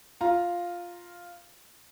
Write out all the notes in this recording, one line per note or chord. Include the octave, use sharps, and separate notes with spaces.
F4 A#5